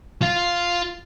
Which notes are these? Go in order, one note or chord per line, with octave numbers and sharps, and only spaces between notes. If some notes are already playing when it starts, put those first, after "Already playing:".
F4 F5